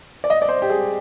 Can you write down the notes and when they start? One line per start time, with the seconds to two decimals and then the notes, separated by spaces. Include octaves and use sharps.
0.24 D5
0.30 D#5
0.42 D5
0.49 C5
0.62 G4
0.70 G#4